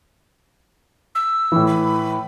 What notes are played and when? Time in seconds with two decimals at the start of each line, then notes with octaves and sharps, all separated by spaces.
1.15 E6
1.52 A2 E3
1.67 B5